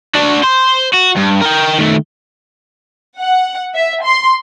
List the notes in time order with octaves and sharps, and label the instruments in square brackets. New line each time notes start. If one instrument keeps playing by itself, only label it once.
[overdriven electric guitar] D4 F#4
C5
F#4
G2
A#4 G5
D#3 A3
[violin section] F#5
E5
C6